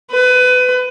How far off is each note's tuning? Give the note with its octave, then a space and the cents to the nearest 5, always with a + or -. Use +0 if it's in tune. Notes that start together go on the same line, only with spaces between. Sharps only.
B4 +25